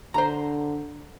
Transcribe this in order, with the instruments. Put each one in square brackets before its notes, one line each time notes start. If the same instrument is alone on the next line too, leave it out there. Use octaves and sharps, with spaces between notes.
[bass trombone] D3 [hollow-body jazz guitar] C5 A#5